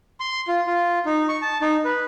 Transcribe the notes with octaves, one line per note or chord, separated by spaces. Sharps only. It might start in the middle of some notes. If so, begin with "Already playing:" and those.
C6
F4
F4
D#4
C#6
A5
D#4
B4